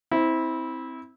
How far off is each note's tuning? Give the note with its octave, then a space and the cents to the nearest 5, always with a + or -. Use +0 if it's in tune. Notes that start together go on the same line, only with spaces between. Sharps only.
C4 +0 E4 -20